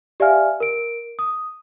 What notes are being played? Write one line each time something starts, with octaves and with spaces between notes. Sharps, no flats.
G4 D5 E5 F5 G#5 F6
A#4 D7
D#6